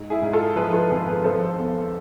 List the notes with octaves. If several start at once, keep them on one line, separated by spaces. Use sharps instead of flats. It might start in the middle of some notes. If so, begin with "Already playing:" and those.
Already playing: G#2
E4 G#4
G#2
F4 A4
F3 G#4 B4
F4 A4
G#1 G#4 B4
G#4 B4
F3 A4 C5
E2